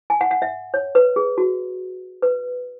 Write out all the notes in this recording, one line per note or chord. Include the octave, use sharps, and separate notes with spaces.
G#5
F#5
F#5
E5
C#5
B4
G#4
F#4
B4